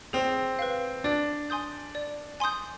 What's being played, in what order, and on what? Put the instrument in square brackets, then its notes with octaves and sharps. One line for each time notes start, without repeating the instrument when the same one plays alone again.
[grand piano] C4 [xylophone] G#4
[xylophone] B4 F5
[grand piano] D4 [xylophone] D5
[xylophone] G#5 C6 D#6 G6
D5
G#5 C6 D#6 G6